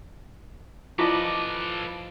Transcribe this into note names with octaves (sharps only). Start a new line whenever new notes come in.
F3 E4 F4 A4 B4 D5 D#5 D6